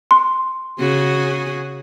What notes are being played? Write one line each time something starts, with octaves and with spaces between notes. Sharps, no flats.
C6
C#3 F#4 G#4